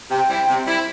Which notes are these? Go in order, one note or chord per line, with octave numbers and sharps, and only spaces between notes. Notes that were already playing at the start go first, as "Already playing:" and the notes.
C3 G5
G3 C4 E4
C3
G3 C4 E4